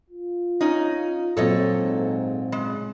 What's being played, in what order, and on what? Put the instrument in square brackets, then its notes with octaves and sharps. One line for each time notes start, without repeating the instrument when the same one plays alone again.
[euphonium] F4
[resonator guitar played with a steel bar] C#4 D#4
[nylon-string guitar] A#2 F#3 C4 [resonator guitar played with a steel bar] A4 C#5 D#5
[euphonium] G#2
[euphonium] C#3 [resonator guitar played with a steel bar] G#3